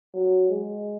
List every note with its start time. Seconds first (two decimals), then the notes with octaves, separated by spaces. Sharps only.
0.14 F#3
0.49 G#3